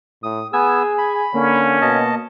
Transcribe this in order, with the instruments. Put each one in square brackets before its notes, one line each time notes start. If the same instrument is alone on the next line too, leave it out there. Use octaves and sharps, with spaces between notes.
[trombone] A2 [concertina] D#6
[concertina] B3 E6 [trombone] G#4 [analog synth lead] G#5
[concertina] B5
[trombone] D3 [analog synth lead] A#3 [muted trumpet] C#4
[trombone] B2 [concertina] D#5 A5